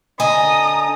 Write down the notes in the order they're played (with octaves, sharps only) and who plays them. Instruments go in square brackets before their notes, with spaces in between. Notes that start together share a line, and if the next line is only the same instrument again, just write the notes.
[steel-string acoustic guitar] D3 D#5 G#5 [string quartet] A#5 D#6